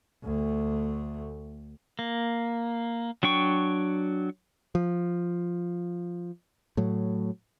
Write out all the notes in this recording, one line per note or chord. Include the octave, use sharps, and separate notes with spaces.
D2 A3
A#3
F#3 D4 G5 C#6
F3
A2 F#3